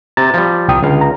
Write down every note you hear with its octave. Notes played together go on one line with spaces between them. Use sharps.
C3 A#5 A6
F3 G3
C2 G5 D#6
C#2 D3 F5
A#5